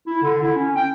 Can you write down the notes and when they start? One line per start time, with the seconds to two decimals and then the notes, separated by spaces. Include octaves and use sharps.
0.07 E4
0.23 D3
0.43 E4
0.56 C#4
0.75 G5